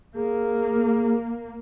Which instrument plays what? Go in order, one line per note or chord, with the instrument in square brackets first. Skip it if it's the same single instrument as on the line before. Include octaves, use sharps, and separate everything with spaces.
[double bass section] A#3 [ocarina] G#4